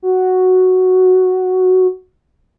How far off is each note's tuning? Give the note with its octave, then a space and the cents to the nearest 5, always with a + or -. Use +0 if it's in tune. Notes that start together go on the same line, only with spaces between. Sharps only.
F#4 +0